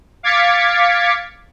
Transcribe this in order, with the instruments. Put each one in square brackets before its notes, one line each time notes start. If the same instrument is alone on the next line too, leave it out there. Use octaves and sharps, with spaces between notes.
[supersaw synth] F5 D6 G#6 A6 B6 C#7